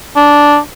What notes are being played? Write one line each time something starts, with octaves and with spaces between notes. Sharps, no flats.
D4